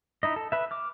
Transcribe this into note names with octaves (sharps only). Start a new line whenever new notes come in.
D#4 E4 D#5
A4
B4 E5
D6 F6